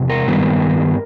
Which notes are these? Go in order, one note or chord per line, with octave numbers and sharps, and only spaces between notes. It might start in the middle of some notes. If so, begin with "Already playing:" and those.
Already playing: E2 C3
A#4
G2 D#3 G3 B3